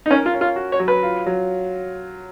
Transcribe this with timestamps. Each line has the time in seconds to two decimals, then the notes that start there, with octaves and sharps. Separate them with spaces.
0.06 D#4
0.10 C#4 A#4
0.26 F4
0.34 C#4
0.41 F4
0.56 F#4
0.72 C#5
0.80 F#3
0.88 B4
1.03 F4
1.26 F#3